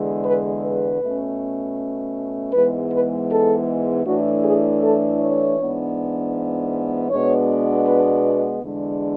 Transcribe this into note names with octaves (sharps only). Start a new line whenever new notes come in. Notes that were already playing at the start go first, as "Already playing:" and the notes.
Already playing: E2 D3 G#3
B4
B4
B2 A3 C#4
G#2 E3 G#3 B3 B4
B4
A4
A2 E3 A3 D4 F#4
G#4
A4
C#5
G#2 E3 B3 D4
B2 G#3 B3 D4 C#5
B4
E2 D3 G#3 D4